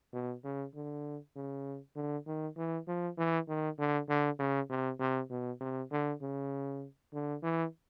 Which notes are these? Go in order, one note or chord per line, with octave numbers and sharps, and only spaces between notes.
B2
C#3
D3
C#3
D3
D#3
E3
F3
E3
D#3
D3
D3
C#3
C3
C3
B2
C3
D3
C#3
D3
E3